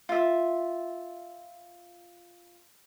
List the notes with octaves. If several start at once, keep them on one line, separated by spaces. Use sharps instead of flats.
F4 E5